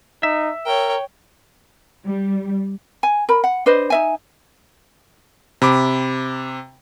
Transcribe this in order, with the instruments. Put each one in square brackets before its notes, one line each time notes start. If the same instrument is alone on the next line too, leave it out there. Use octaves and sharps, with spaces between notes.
[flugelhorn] D#4 [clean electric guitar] E5
[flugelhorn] A#4 [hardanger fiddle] C#5 G5
[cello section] G3
[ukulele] G#5
A#4 B5
F#5
D4 B4 C5 D#5
D#4 E5 G#5
[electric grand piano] C3 B5 D6